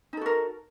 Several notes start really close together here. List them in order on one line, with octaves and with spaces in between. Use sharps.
D#4 A4 F#4 A#4